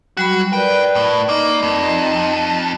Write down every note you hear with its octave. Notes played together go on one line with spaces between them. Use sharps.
F#3 G3 F#4 B5
A#4 B4 D5 G5
A2
A#3 D#4
F2
D#5